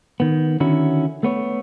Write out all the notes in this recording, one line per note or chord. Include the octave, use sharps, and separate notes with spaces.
D#3 B3
D3 D#3 C#4 E4 F#4
A3 B3 C#5